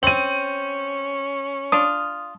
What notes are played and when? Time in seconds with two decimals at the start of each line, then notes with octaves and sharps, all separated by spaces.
0.03 C4 C#4 D#7 F#7
1.72 D4 F4 D#6